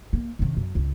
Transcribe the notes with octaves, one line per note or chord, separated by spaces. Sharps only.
A#3
C3 D#3
F#2
C#2